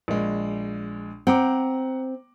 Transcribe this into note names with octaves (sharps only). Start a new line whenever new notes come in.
A#1 G#3
C4 F#5 A#5 D6